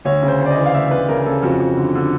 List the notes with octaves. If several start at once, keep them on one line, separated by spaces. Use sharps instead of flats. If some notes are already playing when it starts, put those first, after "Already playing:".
D2 C#5
C#3
C5
D2
D5
D#5
E3
F5
D2 E5
D2 B4
C#3 A#4
C#3 A4
F2 F#4
F2
D3
D3